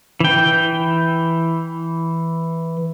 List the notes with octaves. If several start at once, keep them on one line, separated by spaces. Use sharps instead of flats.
E3 G5